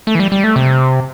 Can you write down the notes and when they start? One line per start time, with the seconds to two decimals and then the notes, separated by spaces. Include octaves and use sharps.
0.07 A3
0.15 E3
0.20 G3
0.32 G3
0.44 A3
0.56 C3